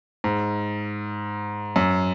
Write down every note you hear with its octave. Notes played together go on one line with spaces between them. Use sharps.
G#2
F#2